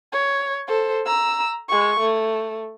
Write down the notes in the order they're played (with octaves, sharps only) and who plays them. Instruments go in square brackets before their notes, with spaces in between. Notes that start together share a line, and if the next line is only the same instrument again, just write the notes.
[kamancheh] C#5
A4 C5
A#5 E6
G#3 C#6
A3